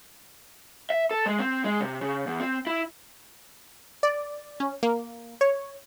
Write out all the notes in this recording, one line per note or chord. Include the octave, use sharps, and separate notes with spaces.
E5
A4
G#3
C4
G#3
C3
C#3
E2
C4
E4
D5
C#4
A#3
C#5